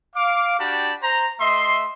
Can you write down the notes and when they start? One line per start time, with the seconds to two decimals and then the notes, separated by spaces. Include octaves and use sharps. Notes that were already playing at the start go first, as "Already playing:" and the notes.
0.15 F5 D6
0.59 D4 F#4 G4 G5 A5 B5
1.02 C5 A#5
1.40 A3 D#5 E5 C6